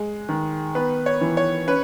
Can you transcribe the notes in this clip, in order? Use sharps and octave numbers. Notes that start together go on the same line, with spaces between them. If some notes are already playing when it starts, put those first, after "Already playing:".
Already playing: G#3
D#3
B3 B4
C#5
E3
C#5
C#4 B4